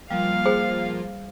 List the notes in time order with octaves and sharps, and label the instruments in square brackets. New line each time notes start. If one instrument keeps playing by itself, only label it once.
[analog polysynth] F3 A#3 F4 [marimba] G3 [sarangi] F5
[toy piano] G#4 C5 G5